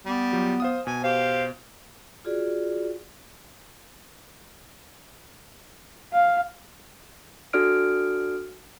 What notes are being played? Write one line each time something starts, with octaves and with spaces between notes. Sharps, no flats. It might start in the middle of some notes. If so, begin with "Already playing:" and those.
G3 B3
F#3 F4 G4
C5 F5 D#6
B2 G#5
G4 C5 F5
F4 F#4 G#4 D5
F5
D4 F#4 A4 D5 F6 D7